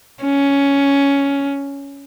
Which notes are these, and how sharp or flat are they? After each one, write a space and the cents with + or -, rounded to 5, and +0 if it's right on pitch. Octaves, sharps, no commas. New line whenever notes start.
C#4 +10